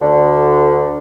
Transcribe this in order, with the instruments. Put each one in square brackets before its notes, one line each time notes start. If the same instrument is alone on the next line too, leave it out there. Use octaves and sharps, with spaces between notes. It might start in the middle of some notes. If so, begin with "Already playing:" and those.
[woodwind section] D2 D3